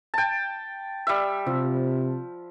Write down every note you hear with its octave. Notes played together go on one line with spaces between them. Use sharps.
G5 A5
G3 E5
C3 F3